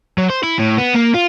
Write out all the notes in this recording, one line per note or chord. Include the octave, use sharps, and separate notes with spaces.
F#3
C5
E4
A2
B3
A#3
F4